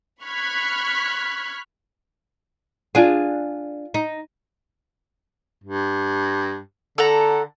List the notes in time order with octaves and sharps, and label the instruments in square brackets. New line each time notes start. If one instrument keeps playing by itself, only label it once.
[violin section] B5 C#6 F6 F#6 G#6 B6
[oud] D4 G#4 [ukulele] F4 G#5
[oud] D#4
[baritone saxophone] G2
[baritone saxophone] D3 [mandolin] A4 F#5 A#5